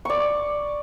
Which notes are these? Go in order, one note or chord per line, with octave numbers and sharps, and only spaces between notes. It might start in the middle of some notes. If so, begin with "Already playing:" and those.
D5 C#6